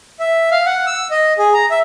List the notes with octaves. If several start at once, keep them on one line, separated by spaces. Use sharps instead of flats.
E5
F5
F#5
E6
D#5
G#4
A#5
E5